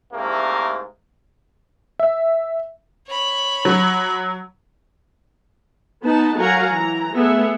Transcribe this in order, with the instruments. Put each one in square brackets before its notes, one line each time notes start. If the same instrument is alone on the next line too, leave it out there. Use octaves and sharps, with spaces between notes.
[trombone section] C2 G#2 C3 A3 A#3
[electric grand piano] E5
[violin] C#5 B5
[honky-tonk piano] F#3
[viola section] B3 D#4 B4 A5
F#3 A#4 F5 F#5 G#5 A#5
E3 A#5
A3 B3 G#4 E5